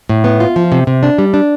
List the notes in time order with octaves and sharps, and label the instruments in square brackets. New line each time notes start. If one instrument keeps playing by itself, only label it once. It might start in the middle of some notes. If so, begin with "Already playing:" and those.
[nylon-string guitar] A2
B3
F4
F3
C3
C3
D4
G3
D4